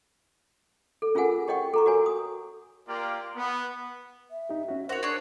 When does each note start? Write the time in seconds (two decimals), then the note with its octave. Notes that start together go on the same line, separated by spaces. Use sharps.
1.02 A4
1.15 C#4 F4 G#4 A#4 F#5 G#5
1.48 G4 C#5 D#5 F#5 G5 C#6
1.74 A4 A#5 C#6
1.86 F#4 A#4 C#5 G#5
2.06 D#6
2.88 A#3 F4 G4 A#4 D5
3.35 B3
4.31 E5
4.49 D#4 G4
4.68 C#4 F#4
4.89 F#4 A#4 C5 C#5
5.03 D4 G#4 C#5